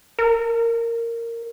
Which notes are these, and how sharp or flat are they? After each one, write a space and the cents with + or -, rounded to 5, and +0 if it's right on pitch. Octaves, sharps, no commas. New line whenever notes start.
A#4 -10